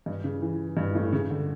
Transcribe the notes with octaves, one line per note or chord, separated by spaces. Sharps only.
G2
C#3
E3
G2
A2
C#3
D3